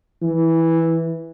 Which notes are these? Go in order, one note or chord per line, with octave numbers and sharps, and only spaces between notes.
E3